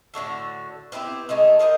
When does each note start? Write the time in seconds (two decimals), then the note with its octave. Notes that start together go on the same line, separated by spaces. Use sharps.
0.14 A2 D3 F#4 A4
0.92 B3 C4 E4 G4
1.29 G#3 A3 D#4 E4
1.59 A#4 C5 D#5 G5